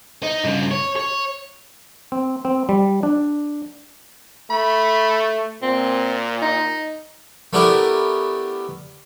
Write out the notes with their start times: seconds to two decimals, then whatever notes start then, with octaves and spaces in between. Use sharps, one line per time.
0.23 D#4
0.44 G2 C#3
0.71 C#5
0.96 C#5
2.12 C4
2.45 C4
2.69 G3
3.03 D4
4.50 A3 B5
5.62 A#2 C4
6.42 D#4
7.53 A3 B3 D4 E4 G4 A#4